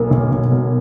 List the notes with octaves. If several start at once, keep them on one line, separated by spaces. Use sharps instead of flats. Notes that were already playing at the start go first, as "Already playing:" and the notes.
Already playing: B1 A#3
B1
B1
B2